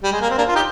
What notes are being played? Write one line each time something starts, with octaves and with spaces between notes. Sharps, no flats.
G3
G#3
A#3
C4
A#3 D4
F4
D#4 G4